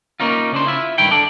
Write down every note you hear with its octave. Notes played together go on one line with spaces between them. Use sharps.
A#3 C#4 D#4 F4
C#3 D4 C5
E4 F4 E5
C#2 G2 D#3 E4 G5
D4 A4 D5